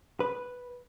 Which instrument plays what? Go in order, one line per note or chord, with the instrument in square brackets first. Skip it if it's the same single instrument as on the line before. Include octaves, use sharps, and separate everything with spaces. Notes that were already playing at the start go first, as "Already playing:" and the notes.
[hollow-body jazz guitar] B4